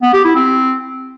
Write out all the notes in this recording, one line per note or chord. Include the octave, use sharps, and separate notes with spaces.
B3
G4
E4
C4